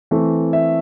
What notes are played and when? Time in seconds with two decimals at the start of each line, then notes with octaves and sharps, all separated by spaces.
0.11 E3 A3 C4
0.53 E5